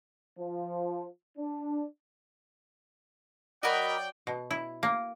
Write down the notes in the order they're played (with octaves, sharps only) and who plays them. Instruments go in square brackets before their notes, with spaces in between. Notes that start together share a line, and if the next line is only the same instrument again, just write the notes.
[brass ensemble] F3
D4
[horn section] F#3 D5 G5 [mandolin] F#4 A#4 B5 [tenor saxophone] D#5
[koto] B2
E4
A#3